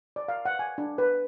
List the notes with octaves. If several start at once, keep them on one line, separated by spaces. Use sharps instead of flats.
D5
F5
F#5
G#5
D4
B4